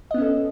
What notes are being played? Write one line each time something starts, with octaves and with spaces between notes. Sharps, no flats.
B3 C#4 A4 D#5